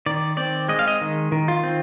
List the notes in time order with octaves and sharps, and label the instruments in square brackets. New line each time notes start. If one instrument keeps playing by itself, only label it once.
[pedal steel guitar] D#3 D5
C4 D5
G#3 D#5
F5
D#5
D#3
D#3
F4
C4